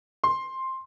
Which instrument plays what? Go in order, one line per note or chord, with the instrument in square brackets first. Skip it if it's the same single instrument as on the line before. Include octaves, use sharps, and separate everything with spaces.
[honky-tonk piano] C6